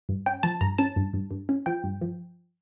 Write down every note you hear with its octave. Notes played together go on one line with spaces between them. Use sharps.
G2
C#4 G5
F3 A5
G2 A#5
C#4 A5
G2
G2
G2
C#4
F3 G5
G2
F3